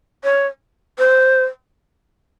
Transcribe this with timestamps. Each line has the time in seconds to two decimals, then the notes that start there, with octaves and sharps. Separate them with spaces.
0.24 C#5
0.99 C5